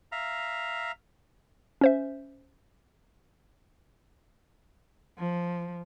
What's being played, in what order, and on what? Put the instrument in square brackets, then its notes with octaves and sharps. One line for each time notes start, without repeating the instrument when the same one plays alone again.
[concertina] E5 F5 A#5
[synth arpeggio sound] C#4 C5 E5
[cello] F3